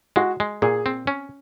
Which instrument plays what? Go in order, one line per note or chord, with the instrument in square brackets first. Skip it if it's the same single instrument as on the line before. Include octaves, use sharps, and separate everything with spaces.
[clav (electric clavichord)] G#3 [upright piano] F#4
[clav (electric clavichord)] G#3
[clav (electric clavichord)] A#2 [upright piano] G#4
[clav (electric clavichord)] C4
C#4